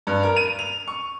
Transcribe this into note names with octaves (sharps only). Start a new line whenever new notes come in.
G2
A#4
D#7
F7
C#6